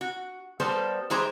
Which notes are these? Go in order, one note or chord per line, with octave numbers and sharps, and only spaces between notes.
F#4
G3 A#3 B3 A4 C5
E3 G#3 E4 G4 C5 A#5